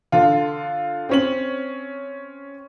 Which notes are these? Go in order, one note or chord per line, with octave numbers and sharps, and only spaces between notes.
D3 F4
C4 C#4 F#7